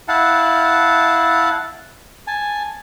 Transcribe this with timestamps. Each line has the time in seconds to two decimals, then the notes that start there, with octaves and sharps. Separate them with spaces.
0.08 E4 F5 F#5 A5
2.27 G#5 A5